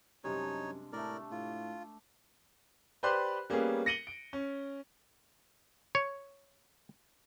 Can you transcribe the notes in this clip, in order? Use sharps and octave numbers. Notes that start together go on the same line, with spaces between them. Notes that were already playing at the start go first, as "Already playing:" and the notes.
F#2 C3 G3 G#3 D4 D#4 C#5
A2 A3 D4 A#4 D5
A2 F4
G4 B4 C5 D5 C6 F#6
G3 A#3 B3 C#4 G#4
A#6 C#7 D#7 F#7 G7
D7
C#4
C#5